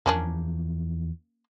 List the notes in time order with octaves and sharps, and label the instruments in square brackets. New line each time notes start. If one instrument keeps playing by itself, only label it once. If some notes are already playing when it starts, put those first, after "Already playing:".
[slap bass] E2 E3 F3 [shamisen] A#3 C#4 D4